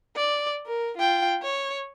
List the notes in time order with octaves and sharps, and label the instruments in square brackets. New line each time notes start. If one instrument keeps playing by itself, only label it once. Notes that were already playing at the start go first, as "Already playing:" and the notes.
[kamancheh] D5
A#4
F4 G5
C#5